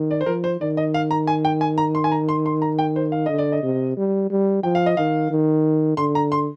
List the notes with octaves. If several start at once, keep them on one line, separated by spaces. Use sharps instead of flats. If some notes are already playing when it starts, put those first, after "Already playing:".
Already playing: D#3
D5
C5
F3 A#4
C5
D#3 D5
D#5
F5
A#5
G#5
G5
G#5
A#5
C6
G#5
A#5
C6
C6
A#5
G5
C5
F5
D3 D#5
D5
D#5
C3
G3
G3
F3 G5
F5
D#5
D#3 F5
D#3
D3 C6
A#5
C6